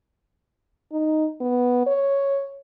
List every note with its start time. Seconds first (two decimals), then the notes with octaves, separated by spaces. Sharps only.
0.92 D#4
1.40 B3
1.87 C#5